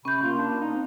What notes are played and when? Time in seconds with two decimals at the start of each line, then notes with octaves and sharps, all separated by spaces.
0.05 C3 C#4 B5 G6
0.23 A#3 F4
0.38 D4
0.60 D#4
0.72 C4